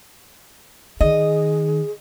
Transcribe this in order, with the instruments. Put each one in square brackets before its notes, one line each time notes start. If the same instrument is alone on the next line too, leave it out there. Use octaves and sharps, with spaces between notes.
[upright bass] D#3 [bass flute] G#4 [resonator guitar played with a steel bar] D#5